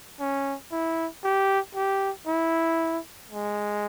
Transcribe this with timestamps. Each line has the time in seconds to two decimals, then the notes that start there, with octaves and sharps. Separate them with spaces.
0.20 C#4
0.72 E4
1.24 G4
1.75 G4
2.27 E4
3.31 G#3